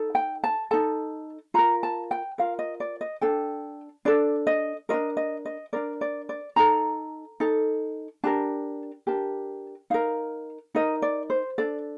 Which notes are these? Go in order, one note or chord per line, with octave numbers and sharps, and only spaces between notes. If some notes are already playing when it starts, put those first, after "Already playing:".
Already playing: D#4 A4
G5
A5
D#4 A4 A5
F4 A#4 A#5
A5
G5
F4 A#4 F5
D#5
D5
D#5
D4 A4 G5
D4 A4 D5
D#5
D4 F4 A#4 D#5
D#5
D#5
D4 F4 A#4 D5
D5
D5
D#4 A4 A#5
D#4 A4
D4 G4 A#4 A5
D4 G4 A#4 A5
D#4 A#4 F5
D#4 A#4 D#5
D5
C5
D4 A4 D5